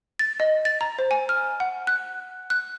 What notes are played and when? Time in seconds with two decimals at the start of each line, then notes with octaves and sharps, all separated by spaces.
0.19 A6
0.40 D#5
0.65 A6
0.81 A#5
0.99 C5
1.11 G#5
1.29 F6
1.60 F#5
1.87 F#6
2.50 F#6